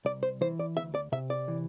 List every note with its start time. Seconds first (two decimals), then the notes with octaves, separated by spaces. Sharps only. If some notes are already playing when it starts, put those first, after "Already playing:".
0.05 C2 D5
0.23 C5
0.41 E3 C5
0.60 D5
0.77 D2 E5
0.95 D5
1.12 C3 E5
1.30 D5
1.48 E3